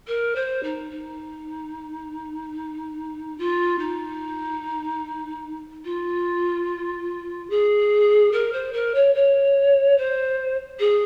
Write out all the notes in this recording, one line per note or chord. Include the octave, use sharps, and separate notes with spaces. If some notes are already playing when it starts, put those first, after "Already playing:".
A#4
C5
D#4
D#4
F4
D#4
F4
G#4
A#4
C5
A#4
C#5
C#5
C5
G#4